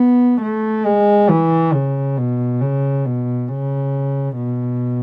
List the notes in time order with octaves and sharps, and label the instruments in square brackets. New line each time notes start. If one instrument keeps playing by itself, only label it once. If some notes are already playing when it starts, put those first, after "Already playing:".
Already playing: [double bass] B3
A3
G#3
E3
C#3
B2
C#3
B2
C#3
B2